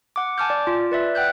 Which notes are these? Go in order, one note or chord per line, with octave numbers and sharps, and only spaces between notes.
F#5 D6
G#5 A5 D6 F6 G6
D5
F4
B4 D5 E5
F#5 G5 F#6 G6